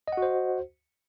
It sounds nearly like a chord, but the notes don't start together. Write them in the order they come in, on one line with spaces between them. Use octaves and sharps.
D#5 F#5 F#4 C5